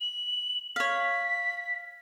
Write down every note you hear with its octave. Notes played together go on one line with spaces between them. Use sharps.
F#7
C#5 F5 B6